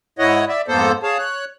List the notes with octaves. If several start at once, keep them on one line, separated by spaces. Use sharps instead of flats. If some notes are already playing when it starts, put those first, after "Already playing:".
G#2 E4 C#5 D#5 F#5
D5 E5
F2 G#2 A#3 B3 A4 C5
G#4 C#5 F5 A5
C#5 F#6